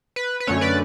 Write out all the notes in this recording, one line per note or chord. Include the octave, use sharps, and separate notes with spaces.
B4
B4
F#2 D3 A3 C#4 C#5
B4 D5